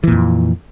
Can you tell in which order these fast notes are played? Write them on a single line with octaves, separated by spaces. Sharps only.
E3 A#2 F2